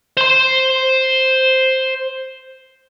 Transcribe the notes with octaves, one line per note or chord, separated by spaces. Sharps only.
C5 C6